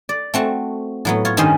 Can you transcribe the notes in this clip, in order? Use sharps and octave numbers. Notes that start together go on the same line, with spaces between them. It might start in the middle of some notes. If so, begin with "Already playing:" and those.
D5
A3 C4 F#4
A2 F#3 B3
F4 C#5
G2 D#3 C#4 C5 D#5 C6